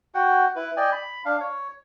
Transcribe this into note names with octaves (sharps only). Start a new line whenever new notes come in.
F#4 F#5 G5
E4 B4
D5 D#5 G5 G#5
B5
D4 F5
C#5